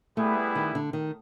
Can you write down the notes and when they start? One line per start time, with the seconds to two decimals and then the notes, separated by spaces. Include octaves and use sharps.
0.17 G3 A3 B3 E4 G#4 B4
0.55 D#3
0.75 D3
0.93 D#3